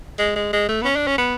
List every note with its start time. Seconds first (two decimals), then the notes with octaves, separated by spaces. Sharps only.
0.18 G#3
0.36 G#3
0.53 G#3
0.69 A3
0.82 B3
0.85 C#4
0.96 D4
1.07 C#4
1.18 B3